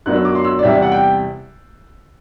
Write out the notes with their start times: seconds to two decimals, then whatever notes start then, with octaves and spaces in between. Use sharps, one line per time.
0.06 F#2 F#3 B3 D4 F#6
0.15 E6
0.25 D6
0.35 C6
0.45 E6
0.59 D5
0.63 E2 C3 G3 E5
0.73 D5
0.82 F#5
0.92 G5